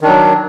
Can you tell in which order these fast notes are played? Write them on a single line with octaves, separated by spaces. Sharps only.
D#3 D4 F#3